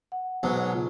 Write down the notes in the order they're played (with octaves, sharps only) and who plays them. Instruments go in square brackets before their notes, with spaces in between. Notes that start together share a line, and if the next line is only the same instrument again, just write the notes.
[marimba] F#5
[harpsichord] B1 G#2 F#3
[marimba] C#3 F4